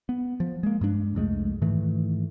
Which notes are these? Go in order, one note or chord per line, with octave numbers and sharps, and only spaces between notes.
B3
F3
G#3 A#3
G2 G#3 D4
C2 F2 G#3 A3
G#2 D#3 E3 A3